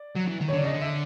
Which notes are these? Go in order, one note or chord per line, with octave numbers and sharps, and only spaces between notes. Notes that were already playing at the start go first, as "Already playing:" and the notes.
Already playing: D5
F#3
E3
D#3
C#5
D3 D5
C#3 D#5
D3
E5